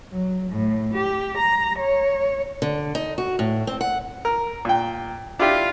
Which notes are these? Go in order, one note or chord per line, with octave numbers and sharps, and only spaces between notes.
F#3
A2
G4
A#5
C#5
D3
D#4
F#4
A2
C4
F#5
A#4
A#2 G5
D4 E4 F4 G4